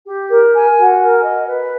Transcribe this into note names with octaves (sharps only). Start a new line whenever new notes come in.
G4
A#4
G#5
F#4
A#4
D#5
B4